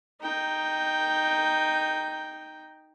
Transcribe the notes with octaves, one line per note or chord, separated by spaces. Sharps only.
D#4 G5